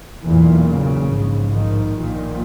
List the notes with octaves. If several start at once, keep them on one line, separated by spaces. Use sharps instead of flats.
B1 E2 A#2 E3
C#3
A#1 G#2
D#3
A#1 A#2 D#3